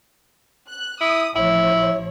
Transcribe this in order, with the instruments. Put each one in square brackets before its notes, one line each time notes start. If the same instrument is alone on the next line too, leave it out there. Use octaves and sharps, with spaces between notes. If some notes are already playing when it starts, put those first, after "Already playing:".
[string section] F#6
[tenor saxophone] E4 [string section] D#6
[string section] A1 F3 C#5 [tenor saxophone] E4